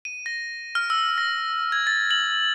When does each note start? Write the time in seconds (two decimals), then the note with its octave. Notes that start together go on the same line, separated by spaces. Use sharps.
0.05 D#7
0.26 A#6
0.75 F6
0.90 E6
1.18 A#6
1.72 G#6
1.87 A6
2.11 F#7